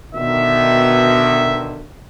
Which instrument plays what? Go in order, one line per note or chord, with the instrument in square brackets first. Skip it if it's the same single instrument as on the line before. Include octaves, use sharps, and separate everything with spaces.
[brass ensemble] B2 D3 D#3 [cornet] E5